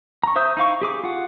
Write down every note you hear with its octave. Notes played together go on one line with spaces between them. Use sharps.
A#5 C#6
C5 E5 D#6 G6
D#4 E4 F5 C#6
G4 G#4 D6
F4 F#5